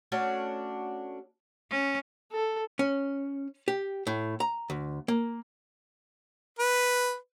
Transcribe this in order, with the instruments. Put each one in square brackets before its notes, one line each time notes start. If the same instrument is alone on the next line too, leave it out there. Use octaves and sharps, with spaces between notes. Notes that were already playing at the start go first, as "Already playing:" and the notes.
[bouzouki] A3 C#4 D4 F#4
[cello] C#4
[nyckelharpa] A4
[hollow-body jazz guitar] C#4
G4
A2
A#5
D2
A#3
[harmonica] B4